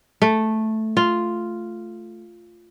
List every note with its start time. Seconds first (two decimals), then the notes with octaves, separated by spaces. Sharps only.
0.22 A3
0.97 F4